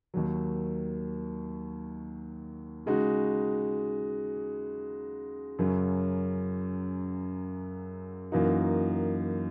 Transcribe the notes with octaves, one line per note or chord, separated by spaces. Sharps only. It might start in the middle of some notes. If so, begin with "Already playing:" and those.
D#2 D#3 F#3
C#3 G#3 D#4 F#4
F#2 C#3 F#3 C#4
F#2 E3 A#3 D#4 F#4